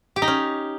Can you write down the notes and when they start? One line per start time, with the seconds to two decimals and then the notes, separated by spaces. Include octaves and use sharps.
0.16 G4
0.22 D#4
0.28 C#4